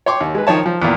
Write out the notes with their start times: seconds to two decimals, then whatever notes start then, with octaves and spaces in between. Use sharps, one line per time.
0.06 C#5 G5 C6 D6
0.21 D#2
0.35 G#3 B4
0.47 D#3 F3 C#5 A5
0.66 F3
0.82 E2 A#2